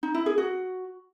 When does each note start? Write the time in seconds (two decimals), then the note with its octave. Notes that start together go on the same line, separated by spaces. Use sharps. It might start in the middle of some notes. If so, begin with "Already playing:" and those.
0.03 D#4
0.14 E4
0.26 G#4
0.38 F#4